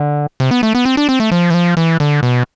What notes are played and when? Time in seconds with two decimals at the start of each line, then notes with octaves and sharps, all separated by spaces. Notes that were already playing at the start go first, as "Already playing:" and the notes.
Already playing: D3
0.40 C3
0.51 B3
0.63 A3
0.75 B3
0.85 C4
0.97 D4
1.09 C4
1.20 A3
1.32 F3
1.50 E3
1.54 F3
1.77 E3
2.00 D3
2.23 B2